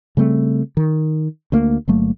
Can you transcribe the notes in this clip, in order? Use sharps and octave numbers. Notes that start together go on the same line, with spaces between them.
C#3 G3 A3 C4
D#3
D2 A3 A#3
G1 F#3 A3 A#3